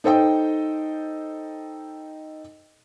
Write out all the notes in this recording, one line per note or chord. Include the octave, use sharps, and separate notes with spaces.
D#4 A4 C5 D#5 G5